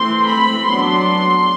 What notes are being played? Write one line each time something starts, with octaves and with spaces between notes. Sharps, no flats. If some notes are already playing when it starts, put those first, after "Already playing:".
Already playing: E3 A3 C4 C6
B5
F#3 B3 D4 C6